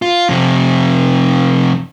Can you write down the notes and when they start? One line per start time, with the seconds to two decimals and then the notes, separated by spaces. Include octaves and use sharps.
0.02 F4
0.29 F2 C3